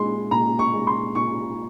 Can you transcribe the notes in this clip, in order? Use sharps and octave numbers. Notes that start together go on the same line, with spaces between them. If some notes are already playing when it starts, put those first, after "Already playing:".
Already playing: A#2 G#3 C6
A#2 A#5
C#6
G#3
C6
A#2 C#6